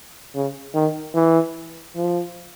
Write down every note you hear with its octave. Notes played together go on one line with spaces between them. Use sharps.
C#3
D#3
E3
F3